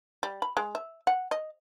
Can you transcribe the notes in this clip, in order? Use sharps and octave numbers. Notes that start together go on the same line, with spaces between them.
G3
B5
G#3
E5
F#5
D#5